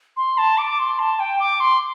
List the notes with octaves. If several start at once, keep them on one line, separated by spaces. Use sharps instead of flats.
C6
A5
D6
C6
A5
G5
D6
C6